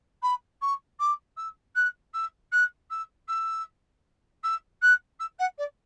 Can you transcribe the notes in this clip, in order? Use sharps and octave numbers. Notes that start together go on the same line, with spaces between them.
B5
C#6
D6
E6
F#6
E6
F#6
E6
E6
E6
F#6
E6
F#5
D5